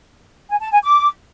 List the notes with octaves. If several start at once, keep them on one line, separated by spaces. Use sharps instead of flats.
G#5
A5
G#5
D6